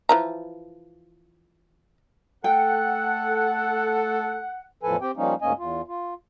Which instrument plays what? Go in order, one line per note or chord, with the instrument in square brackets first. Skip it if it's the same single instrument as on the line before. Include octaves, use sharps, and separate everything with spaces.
[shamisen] E3 F3 A#5
[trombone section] A3 A4 [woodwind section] F#5 [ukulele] G5
[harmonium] E2 A2 F3 A4 B4 G#5
C4 G4 G5
F3 G3 A#3 C#4 D#4
D2 G#2 A#3 C#4 D#5 G#5
E2 F4
F4